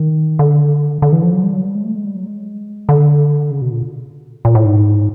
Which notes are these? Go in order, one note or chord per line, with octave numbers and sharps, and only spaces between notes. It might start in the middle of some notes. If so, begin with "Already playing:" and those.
Already playing: D#3
D3
D3
E3
F3
F#3
G3
F#3
G3
G#3
A3
G#3
G3
F#3
G#3
D3
C#3
B2
A#2
A#2
A2
G#2